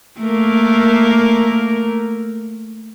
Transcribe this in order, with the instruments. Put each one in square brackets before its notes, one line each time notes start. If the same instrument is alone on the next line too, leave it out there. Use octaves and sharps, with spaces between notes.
[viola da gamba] A3 A#3 A#4